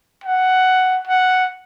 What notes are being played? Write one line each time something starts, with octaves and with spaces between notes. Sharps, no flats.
F#5
F#5